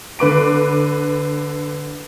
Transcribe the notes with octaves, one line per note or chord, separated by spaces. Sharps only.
D3 B4 D6 D7